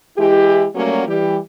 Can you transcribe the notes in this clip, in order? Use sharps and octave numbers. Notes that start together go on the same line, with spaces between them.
E3 G#3 E4 G4
F#3 G3 A3 A#3 C#4 F#4
E3 G3 G4